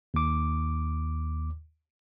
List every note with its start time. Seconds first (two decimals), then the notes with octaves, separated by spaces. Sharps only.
0.14 D#2 D6